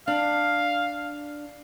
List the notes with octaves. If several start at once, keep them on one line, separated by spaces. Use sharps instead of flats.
D4 F5